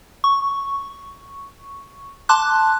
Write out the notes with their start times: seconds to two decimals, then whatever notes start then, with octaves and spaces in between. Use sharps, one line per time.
0.24 C#6
2.29 A5 C6 D6 F#6